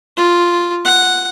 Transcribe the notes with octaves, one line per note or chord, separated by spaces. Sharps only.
F4
F#5